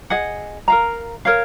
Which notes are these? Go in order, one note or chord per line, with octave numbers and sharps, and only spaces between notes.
G#4 D#5 F#5
A#4 F5 A#5
A#4 C#5 F5